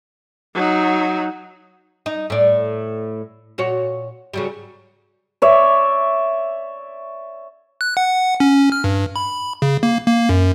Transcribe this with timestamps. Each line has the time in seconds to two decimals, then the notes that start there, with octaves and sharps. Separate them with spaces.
0.54 F#3 D#4
2.06 D#4
2.30 A2 D5
3.58 A#2 F#4 C#5
4.33 C#3 F#3 G3
5.42 C#5 D5 E5
7.81 F#6
7.97 F#5
8.40 C#4
8.72 F6
8.84 G2
9.16 B5
9.62 C#3
9.83 A#3
10.07 A#3
10.29 F#2